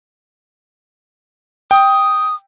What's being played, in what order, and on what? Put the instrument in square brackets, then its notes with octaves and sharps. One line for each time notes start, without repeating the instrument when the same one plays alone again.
[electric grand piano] G5 [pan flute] D#6